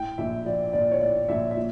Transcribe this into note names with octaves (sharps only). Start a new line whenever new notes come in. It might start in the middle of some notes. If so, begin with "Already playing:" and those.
Already playing: A2 G5
A#1 E5
F3 D5
A#1 D5
C#5
A2 D5
A#1 E5
E5
A#2